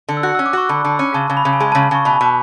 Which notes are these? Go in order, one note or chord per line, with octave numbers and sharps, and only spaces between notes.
D3
E6
F#4 F#6
E6
C#4
D6
F#4 C#6
D3 B5
D3
C#4
C#3 A5
C#3
B5
C#3
G#5
G#3 A5
A5
C#3
A5
C#3 C#6
B2 B5
B2